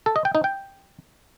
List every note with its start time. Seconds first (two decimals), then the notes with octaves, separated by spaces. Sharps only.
0.06 A4
0.16 D#5
0.25 G5
0.35 D#4
0.44 G5